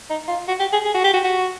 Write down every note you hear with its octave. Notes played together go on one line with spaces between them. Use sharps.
D#4
F4
F#4
G4
G#4
G#4
F#4
G4
F#4
F#4